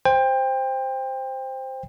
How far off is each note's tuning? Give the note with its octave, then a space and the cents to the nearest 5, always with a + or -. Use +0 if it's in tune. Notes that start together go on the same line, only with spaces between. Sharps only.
C5 +0 G5 +25